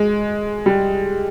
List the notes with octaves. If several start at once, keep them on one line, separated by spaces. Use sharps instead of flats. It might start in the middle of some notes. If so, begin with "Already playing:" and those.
Already playing: G#3
G3